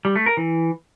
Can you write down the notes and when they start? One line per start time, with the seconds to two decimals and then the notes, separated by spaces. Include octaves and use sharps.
0.05 G3
0.16 A3
0.26 A#4
0.37 E3